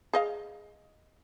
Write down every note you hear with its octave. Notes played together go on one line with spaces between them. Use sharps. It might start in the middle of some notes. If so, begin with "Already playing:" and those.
G#4 D#5 F5